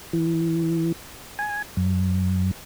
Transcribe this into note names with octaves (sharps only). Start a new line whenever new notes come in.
E3
G#5
F#2